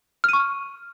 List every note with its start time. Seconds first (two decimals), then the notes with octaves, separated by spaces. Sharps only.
0.24 F6
0.29 D#7
0.33 C#6